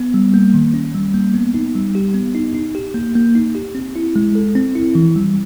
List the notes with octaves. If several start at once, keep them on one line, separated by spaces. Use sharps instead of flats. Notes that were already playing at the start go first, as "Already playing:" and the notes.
Already playing: B3
G3
A#3
D#3
C#4
G3
A#3
B3
D#4
G3
G4
B3
D#4
D#4
G4
A#3
A#3
D#4
G4
C4
E4
G#3
A4
C4
E4
E3
G3